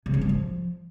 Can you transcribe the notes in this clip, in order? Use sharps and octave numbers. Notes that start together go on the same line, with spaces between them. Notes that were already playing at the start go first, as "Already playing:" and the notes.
C#3
C#4
G3
F3